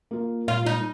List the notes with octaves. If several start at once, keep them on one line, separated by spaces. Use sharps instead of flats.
A#3 F4
A#2 F4
D#4